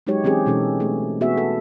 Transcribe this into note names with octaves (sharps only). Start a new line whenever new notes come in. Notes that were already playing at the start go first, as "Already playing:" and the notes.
F#3 G#3 D#4 F#4 G4 C#5
E3 C4 C#4 G4 G#4
B2 E3 G#3 C#4 D#4 A4
A3 G#4
B3 F#4 G#4 E5
A4